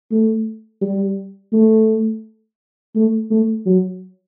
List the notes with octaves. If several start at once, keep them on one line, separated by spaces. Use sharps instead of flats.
A3
G3
A3
A3
A3
F#3